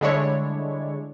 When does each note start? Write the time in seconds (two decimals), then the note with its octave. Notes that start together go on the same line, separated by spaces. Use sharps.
0.01 D3 G3 G#3 D4 E4 C#5